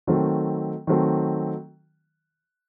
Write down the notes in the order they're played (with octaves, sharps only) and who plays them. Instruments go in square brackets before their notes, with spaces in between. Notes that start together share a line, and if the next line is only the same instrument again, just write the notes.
[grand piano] D#3 F#3 A3 C4
D#3 F#3 A3 C4